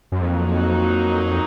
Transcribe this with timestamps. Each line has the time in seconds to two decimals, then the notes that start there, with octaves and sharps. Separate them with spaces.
0.12 F#2
0.21 F2 F#3 A#3 D#4 F#4